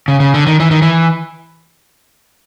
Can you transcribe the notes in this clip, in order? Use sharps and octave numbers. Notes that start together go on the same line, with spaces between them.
C#3
C#3
D3
D#3
E3
D#3
E3